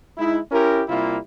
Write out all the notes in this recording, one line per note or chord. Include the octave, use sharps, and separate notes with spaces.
G#3 D#4 E4
C#4 E4 G4 A#4
C3 G3 A#3 E4 F4